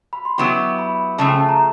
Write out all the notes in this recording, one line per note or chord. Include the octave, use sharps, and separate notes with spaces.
B5
C6
F#3 B3 E4 G4 C#6
B5
C#3 F3 A3 A5
G5
A5
A#5